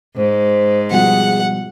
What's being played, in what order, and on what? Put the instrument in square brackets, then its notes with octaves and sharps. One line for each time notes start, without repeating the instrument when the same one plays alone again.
[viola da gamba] G#2 [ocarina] C5
[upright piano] B2 F3 G3 [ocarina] G#4 [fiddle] F#5